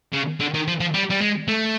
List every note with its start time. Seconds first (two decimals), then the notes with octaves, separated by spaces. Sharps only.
0.13 C#3
0.40 D3
0.54 D#3
0.68 F3
0.80 F3
0.94 G3
1.10 G3
1.21 G#3
1.48 A3